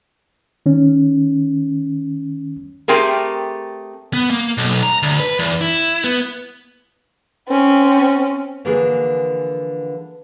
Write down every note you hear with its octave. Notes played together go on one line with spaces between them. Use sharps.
D#3 C#4
A3 C4 G4 G#4 A#4
B3
A#3
B1
A#5
D2
B4
E2
E4
B3
C4 C#4
D3 E3 F3 A#3 F#4 G#4